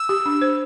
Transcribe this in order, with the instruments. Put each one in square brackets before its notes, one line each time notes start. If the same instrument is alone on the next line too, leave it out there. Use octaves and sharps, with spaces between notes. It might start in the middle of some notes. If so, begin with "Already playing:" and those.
Already playing: [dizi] E6
[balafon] G4
D4
C5